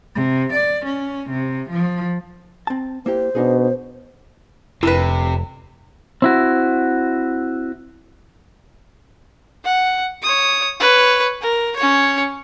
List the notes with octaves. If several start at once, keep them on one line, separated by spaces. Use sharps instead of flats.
C3
D5
C#4
C3
F3
C4 A5
A#3 E4 G4 C5
B2 D4 D#4 G#4
F1 C3 D4 E4 A#4 B4
C4 E4 F#4
F#5
C#5 D#6
B4 C#5
A#4
C#4 C#5